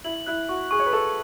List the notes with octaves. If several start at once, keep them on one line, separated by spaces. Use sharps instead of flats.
E4 F#7
E4 F#6
F#4 C#6
G#4 C#6
C#5
B4
A4 C#6